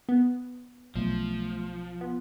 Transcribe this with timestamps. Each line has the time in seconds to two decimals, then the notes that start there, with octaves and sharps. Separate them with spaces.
0.09 B3
0.96 B1 F3 A3
2.01 B3 F4